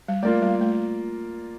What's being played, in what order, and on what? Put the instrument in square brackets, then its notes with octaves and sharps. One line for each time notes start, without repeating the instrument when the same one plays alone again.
[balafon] G3
[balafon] A3 [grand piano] A#3 F4 A#4 D5
[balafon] G3
A3